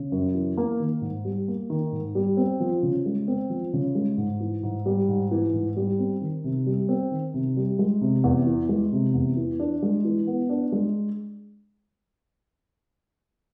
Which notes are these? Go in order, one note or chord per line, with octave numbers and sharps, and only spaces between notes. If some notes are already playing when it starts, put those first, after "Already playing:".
Already playing: C#3
F#2
E3
A#3
D#3
G#2
G3
A#3
D#3
G#2
G3
C4
F3
C#3
G#3
C4
F3
C#3
G#3
G#2
E3
G#2
G3
G#2
E3
G#2
G3
C4
D#3
C3
G3
C4
D#3
C3
G3
G#3
C3
E2
E3
G#3
C3
E2
E3
D4
G#3
E3
B3
D4
G#3